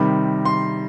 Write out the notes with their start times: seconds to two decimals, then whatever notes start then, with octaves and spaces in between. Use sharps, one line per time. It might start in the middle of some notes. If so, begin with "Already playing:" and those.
Already playing: C3 D#3 G3 B5
0.45 C6